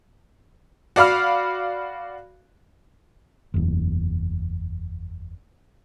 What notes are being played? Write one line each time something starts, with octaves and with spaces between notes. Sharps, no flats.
F#4 D5 F5 B5 F6
F#1 E2